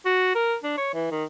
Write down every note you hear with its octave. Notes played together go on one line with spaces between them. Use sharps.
F#4
A#4
D4
C#5
E3
D#3